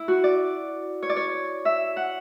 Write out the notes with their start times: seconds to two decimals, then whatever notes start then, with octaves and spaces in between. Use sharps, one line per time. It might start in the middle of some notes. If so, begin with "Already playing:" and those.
Already playing: E4
0.08 F#4
0.24 D5
1.03 C#5
1.10 D5
1.17 C#5
1.65 E5
1.97 F#5